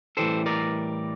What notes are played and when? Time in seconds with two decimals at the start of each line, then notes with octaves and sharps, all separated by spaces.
0.17 A2 E3 G3 A4 C5
0.46 A#4 D5